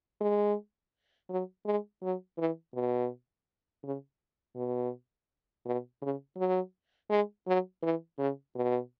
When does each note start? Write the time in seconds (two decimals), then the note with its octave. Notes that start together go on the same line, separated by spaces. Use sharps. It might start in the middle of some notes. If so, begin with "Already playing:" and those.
0.21 G#3
1.30 F#3
1.66 G#3
2.03 F#3
2.38 E3
2.75 B2
3.83 C#3
4.56 B2
5.66 B2
6.02 C#3
6.37 F#3
7.10 G#3
7.47 F#3
7.83 E3
8.18 C#3
8.55 B2